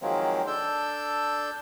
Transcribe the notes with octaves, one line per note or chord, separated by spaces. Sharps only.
D#3 F3 F#3 G#3 A#3 C4
D4 A4 E6 G6